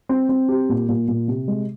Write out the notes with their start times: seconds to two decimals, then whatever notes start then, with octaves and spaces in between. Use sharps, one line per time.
0.09 C4
0.29 C4
0.49 G4
0.69 A#2
0.88 A#2
1.08 A#2
1.28 C3
1.48 G#3